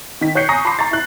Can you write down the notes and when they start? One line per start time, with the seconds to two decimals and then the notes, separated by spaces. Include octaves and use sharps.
0.21 D#3 B6
0.35 C#5 F#6 G6 C7 C#7
0.49 G#5 A#5 C#6 D#6 A#6
0.65 A5 B5 C6 D6 C7
0.79 A#5 C#6 A6
0.91 E4 F#6